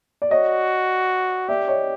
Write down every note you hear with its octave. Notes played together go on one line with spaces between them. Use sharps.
D5
F#4 C#5 D#5
G4 D5 E5
C#5 D#5